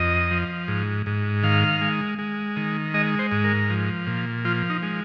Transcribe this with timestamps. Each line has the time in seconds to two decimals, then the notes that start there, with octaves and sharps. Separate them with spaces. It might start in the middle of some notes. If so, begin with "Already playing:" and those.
Already playing: F2 D#5
0.31 F3
0.68 G#2
1.06 G#2
1.43 D#3 F5
1.81 G#3
2.18 G#3
2.57 D#3
2.94 G#3 D#5
3.19 C5
3.32 G#2
3.44 A#4
3.70 F3
4.07 A#2
4.45 F3 F4
4.70 D#4
4.83 G#3